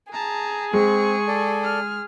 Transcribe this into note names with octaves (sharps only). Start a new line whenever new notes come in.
G#4 A5 A#5
G#3 C4 C#6
A4 D5
F6